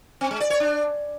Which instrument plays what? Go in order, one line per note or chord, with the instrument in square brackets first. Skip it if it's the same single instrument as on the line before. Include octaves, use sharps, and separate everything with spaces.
[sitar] C4
G#3
D5
C#5
D4